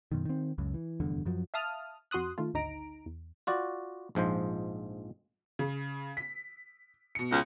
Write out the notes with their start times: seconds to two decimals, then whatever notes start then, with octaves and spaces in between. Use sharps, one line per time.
0.12 F#2 B2 D#3
0.25 D#3 C4
0.58 C#2 F#2 C#3
0.74 E3
1.00 F1 E2 G2 D3
1.25 F#2 F3 F#3
1.54 E5 F5 A5 D#6 F6
2.11 F2 F#4 C6 D#6 F#6
2.38 D#3 A3 F4
2.54 G#1 D2 D#4 A#5 D7
3.06 E2
3.47 F4 F#4 D5
4.15 A#1 G#2 F3 C5
5.59 C#3
6.17 B6
7.15 B2 C#7
7.31 C#2